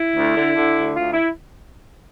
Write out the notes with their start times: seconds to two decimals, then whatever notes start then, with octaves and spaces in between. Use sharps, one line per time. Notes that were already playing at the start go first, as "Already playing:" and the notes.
Already playing: E4
0.14 D2
0.35 D3
0.55 D3
0.77 D2
0.96 D2 F4
1.13 E4